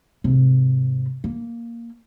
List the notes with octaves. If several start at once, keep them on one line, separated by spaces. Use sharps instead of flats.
G#2 C3
A#3